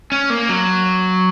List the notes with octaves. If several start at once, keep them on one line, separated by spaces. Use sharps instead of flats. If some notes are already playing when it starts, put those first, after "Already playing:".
C#4
A#3
F#3